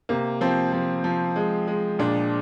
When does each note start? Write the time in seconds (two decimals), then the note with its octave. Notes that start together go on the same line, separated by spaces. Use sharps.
0.09 C3 A#3
0.41 F3 C4
0.73 F3
1.04 F3
1.36 G#3
1.67 G#3
1.99 A#2 D4